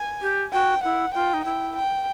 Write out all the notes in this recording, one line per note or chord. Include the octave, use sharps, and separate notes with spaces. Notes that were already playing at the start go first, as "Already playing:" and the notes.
Already playing: G#5
G4
F#4 G5
E4 F#5
F4 G5
D#4
E4 G5
G5